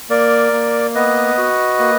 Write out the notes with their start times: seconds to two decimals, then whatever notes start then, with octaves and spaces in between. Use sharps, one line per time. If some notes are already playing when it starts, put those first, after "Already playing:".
0.09 A#3 A#4 D5
0.52 A#3
0.95 B3 B4 D#5
1.38 F#4
1.79 A#3